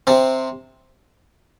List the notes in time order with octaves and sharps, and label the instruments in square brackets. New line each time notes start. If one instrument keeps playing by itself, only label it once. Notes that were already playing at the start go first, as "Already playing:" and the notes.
[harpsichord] C3 C4